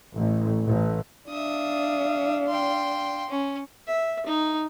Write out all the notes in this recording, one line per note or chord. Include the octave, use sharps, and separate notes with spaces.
A1
A1
D4 E5 F5 D#6
G5 C6
C#4
E5
D#4